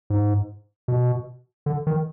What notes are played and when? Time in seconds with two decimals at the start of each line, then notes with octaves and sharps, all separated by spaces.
0.10 G#2
0.88 B2
1.66 D3
1.87 D#3